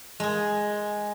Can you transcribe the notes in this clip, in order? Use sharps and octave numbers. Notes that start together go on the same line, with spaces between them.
G#3 G#4